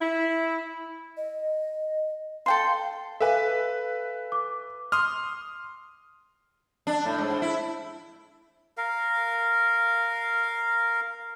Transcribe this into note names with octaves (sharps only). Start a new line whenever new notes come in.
E4
D#5
A4 F5 G5 C6
A4 B4 E5 F5 G#5
D6
C6 D#6 F6
D4
A2
G#2
E4
A#4 F5